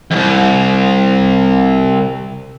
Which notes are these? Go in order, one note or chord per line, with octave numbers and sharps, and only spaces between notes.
C2 F2